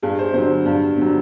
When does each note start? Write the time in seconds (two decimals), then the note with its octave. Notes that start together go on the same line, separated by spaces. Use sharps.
0.03 G2 G#4
0.19 C5
0.34 D3 F#3 C5
0.66 G2
0.98 D3 F#3